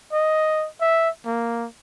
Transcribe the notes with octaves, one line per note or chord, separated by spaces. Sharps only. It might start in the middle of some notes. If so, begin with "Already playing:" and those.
D#5
E5
A#3